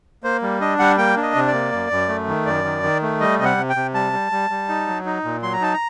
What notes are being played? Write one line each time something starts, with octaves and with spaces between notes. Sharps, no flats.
A#3 C5
G3
D4 D#5
G3 F#5
A#3 G5
D4
D#5
C3
D5
A#3
F#2
F#2
A3
D#3
F#2 D5
D#3
D#3
A3
G3 D#5
C3 D#5
F#5
C3
G5
C3
G3 A5
G3
G3
G3
D#4
F#3
D#4
A#2
F#3 C6
A#5
D#4 A5
A#5